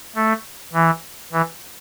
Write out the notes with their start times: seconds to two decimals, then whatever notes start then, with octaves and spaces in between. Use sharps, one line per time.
0.15 A3
0.73 E3
1.33 E3